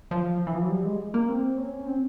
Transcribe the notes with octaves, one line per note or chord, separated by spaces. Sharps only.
F3
E3
F3
F#3
G3
G#3
A#3
C4
C#4
C4